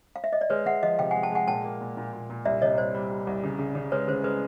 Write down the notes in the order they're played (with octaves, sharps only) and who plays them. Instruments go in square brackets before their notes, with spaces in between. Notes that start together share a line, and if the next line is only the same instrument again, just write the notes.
[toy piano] F5
E5
D#5
D5
[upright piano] G#3 [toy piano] B4 C#5
[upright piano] G#3 [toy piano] E5 F#5
[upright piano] F3 [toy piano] D#5 F5
[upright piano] C3 [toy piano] F5 G5
[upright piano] G#3 [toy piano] F#5 G#5
[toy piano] G5 A5
[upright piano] G#3 [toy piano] F#5 G#5
[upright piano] A#2 [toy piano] G5 A5
[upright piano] A#3
A#2
A#2
A#2
A#2
[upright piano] C2 [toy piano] D5 E5
[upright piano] C3 [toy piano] C#5 D#5
[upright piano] C2 [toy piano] C5 D5
[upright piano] G3
G3
C2
C#3
C#3
C#3
[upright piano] G#3 [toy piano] B4 C#5
[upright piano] C#3 [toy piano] C5
[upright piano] G#3 [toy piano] B4